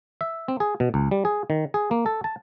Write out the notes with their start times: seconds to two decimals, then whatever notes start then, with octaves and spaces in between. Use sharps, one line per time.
0.21 E5
0.48 C4
0.60 G#4
0.80 B2
0.94 C#2
1.11 G3
1.25 G#4
1.50 D#3
1.74 G#4
1.91 A#3
2.06 A4
2.24 A5